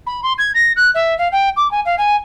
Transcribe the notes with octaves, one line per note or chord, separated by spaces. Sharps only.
B5
C6
G#6
A#6
F#6
E5
F5
G5
D6
G#5
F5
G#5